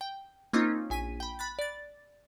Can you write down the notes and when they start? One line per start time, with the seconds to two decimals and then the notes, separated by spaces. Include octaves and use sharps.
0.01 G5
0.53 A#3 C4 C#4 D#4 F4
0.90 A#1 G#5 B6 D#7
1.20 G5 B5
1.39 B5 F#6 A6
1.59 D5 A6